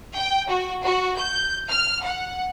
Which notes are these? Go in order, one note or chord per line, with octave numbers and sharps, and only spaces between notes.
G5
F#4
F#4
G6
F6
F#5